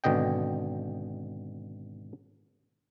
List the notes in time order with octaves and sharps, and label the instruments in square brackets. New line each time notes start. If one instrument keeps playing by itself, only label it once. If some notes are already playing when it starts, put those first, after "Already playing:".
[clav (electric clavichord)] G#1 B2 D3 D#5 G5